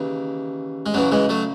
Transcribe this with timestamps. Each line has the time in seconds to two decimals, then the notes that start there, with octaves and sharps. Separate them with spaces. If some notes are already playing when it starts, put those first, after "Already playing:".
Already playing: D#2 C#3 E3
0.86 G#3
0.94 F#2 C#3 E3 F#3
1.12 E3 G#3
1.29 F#3 A3